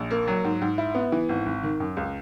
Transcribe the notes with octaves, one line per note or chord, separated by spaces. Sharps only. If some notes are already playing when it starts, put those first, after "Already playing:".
Already playing: A#1
A#3
F#3
G#2
G#2
E4
B3
E3
G#1
G#1
D#3
F#2
C#2